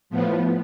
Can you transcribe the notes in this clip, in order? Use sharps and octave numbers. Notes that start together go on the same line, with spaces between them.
A2 F3 B3